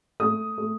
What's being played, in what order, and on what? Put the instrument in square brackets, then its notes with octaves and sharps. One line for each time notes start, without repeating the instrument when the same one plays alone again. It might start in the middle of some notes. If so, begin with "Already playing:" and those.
[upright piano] A3 D#6
A3